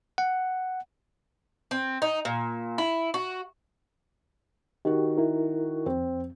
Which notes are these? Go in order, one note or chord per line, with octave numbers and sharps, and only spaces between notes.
F#5
C4
D#4
A#2
E4
F#4
D#3 F#4 G4
E4 A#4
F2 C4